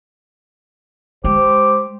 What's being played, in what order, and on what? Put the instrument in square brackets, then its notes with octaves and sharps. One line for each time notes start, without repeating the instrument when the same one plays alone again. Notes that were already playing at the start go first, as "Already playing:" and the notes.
[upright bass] G#3 [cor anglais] G4 [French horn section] C5